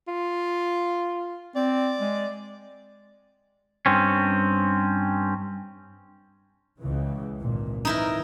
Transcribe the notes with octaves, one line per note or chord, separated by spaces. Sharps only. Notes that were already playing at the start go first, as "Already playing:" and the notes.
F4
C4 D5
G#3
G2 C4 C#4
C#2 C#3 E3
G#1 A#2
E3 D#4 E4 A#4